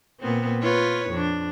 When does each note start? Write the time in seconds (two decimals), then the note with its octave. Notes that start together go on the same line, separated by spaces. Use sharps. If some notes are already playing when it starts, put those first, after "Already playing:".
0.20 A#2 B3 C4
0.62 F4 B4 C#5
1.09 F2 D4